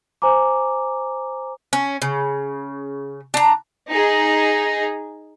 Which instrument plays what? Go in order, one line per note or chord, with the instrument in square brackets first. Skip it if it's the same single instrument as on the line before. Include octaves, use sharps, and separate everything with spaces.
[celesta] C5 G#5 A#5 D6
[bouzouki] C#4
C#3
D4 A#5
[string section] D#4 G#4